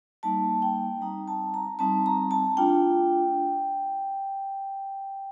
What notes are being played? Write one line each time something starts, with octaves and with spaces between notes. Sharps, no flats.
G3 A#3 D#4 A5
G5
G3 C4 D#4 A#5
A5
A#5
G3 C4 D#4 A5
A#5
A5
A3 D4 F4 G5